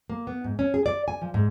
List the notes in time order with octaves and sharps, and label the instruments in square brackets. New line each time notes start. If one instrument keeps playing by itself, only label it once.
[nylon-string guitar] A#3
B3
G#2
C#4
G#4
D5
G#5
F3
G#2